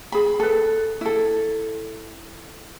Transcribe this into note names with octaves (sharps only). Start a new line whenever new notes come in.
G#4 B5
A4 B4
E4 A4